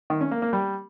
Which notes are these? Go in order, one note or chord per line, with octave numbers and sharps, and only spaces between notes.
D#3
C#4
A#3
A#3
G3